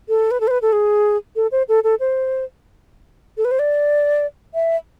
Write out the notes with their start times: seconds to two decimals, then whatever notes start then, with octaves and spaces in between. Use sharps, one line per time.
0.09 A4
0.31 B4
0.40 A4
0.47 C5
0.51 B4
0.62 A4
0.73 G#4
1.36 A4
1.52 C5
1.69 A4
1.84 A4
2.00 C5
3.37 A4
3.45 B4
3.51 C5
3.59 D5
4.54 E5